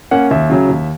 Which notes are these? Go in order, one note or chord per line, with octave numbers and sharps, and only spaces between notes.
A#3 C#4 F#5
D#2 E5
C#3 F#3 C#4
D#2